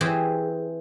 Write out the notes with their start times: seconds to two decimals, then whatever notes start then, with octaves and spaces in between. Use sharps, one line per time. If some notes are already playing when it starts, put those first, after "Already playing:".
0.01 E3 C4 G4 G#4